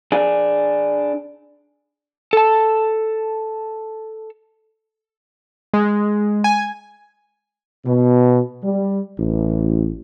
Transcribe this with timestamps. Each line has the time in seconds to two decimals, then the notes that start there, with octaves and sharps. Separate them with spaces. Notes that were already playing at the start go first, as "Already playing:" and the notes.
0.12 D4 G#4
2.33 A4 A5
5.74 G#3
6.44 G#5
7.86 B2
8.63 G3
9.19 A1